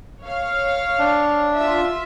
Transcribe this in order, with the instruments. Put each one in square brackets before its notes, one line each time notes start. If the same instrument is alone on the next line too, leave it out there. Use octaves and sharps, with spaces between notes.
[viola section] C#5 F5
[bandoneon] D4
[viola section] F4 E5